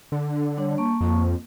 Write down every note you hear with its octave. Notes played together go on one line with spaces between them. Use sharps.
D3
G3 D4 C#5
A#3 A5 C#6
F2